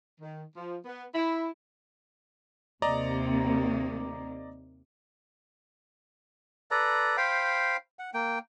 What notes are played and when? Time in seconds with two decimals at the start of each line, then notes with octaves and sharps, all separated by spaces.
0.21 D#3
0.56 F3
0.85 B3
1.15 E4
2.82 D#2 C3 A#3 D5 D#5 A#5
6.71 A4 B4 D5 A#5
7.17 C5 F5 G5 B5
7.99 F#5
8.14 A#3 G5